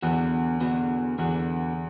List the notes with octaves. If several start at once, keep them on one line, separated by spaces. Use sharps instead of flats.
E2 D3 B3 F#4
D3 B3 F#4
E2 D3 B3 F#4